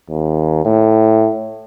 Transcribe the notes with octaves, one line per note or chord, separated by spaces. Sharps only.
D#2
A2